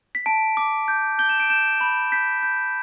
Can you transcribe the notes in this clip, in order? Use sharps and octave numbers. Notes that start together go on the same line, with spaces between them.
B6
A5 D7
D6
G6
G6 G7
E7
D7
G6 E7
B5
G6 B6
G6